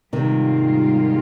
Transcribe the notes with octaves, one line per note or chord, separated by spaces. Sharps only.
G#2 C3 D#3 G3 A#3 F4